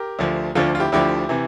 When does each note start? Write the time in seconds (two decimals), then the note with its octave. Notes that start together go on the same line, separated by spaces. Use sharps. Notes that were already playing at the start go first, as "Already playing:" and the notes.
Already playing: G4 A#4
0.19 D2 D3 F3
0.55 D2 D3 F3 F4 A4
0.75 F4
0.80 E4 G4
0.92 D2 D3 F3 E4 G4
1.29 C3 E3